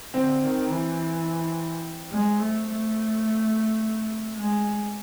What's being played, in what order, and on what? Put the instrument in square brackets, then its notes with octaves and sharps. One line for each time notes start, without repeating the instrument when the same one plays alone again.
[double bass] D3 [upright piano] C4
[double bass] D#3
E3
G#3
A3
A3
G#3